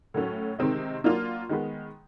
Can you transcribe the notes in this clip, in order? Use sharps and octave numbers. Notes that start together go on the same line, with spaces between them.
A2 F#3 A3 C#4
C3 D#3 G#3 C4 D#4
F#3 A#3 D4 F4
D#3 G#3 B3